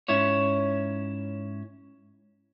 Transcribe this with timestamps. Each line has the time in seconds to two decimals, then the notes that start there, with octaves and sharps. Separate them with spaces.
0.08 G#2 C#4 E4 C#5